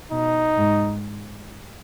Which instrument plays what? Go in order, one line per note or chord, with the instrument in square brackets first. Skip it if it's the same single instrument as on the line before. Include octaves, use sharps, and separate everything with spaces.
[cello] B2 [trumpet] D#4
[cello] G#2